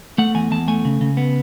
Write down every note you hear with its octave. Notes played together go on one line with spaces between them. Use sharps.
A3 F#5
E2 G#5
E2 A5
A3 G#5
C#3
C#3
B3